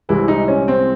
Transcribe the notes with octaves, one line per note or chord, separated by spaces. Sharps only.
C2 C3 E3 G#3 E4
D#4
C#4
C4